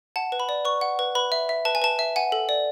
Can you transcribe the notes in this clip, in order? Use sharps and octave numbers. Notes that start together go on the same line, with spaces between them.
F#5 A5
B4
B5
D5
B4 C#6
F#5
B4
B4 B5
E5
E5
B4 A5
G#5
B4 A5
E5
F#5 G#5
A4
D5